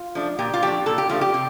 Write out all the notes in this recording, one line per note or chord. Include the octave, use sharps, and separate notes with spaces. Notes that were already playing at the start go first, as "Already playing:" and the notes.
Already playing: F4
F3 A3 D4
A#2 G4
F4
F3 A3 D4 G4
A#2 A4
G4
F3 A3 D4 F4
G4
C3